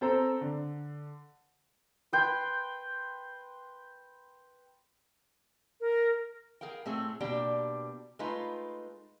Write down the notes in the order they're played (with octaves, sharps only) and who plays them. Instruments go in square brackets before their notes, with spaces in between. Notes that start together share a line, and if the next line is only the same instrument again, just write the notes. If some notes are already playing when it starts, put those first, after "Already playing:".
[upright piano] C4 A4 C5 A#5
D3
[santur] B4 G5 C6
[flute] A#4
[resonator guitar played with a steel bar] G#4 A#4 F5 G5
A2 A3 C4 G#4
B2 A#3 D4 G4 D5 G5
G#3 A3 D#4 F4 B4